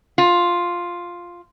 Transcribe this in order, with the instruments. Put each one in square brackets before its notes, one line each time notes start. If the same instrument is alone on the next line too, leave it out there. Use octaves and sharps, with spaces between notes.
[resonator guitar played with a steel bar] F4